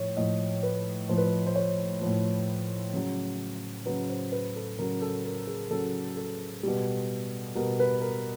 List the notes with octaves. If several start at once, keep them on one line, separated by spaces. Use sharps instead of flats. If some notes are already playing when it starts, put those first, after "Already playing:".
Already playing: A2 F3 C#5
A2 F3 D#5
B4
A2 F3 C5
B4
C5
C5
C#5
A2 F3
C#3 F#3
C#3 F#3 B4
C5
B4
A4
C#3 F#3 A#4
A4
A#4
G#4
C#3 F#3 A4
A4
B2 G3
B2 G3 A#4
B4
A#4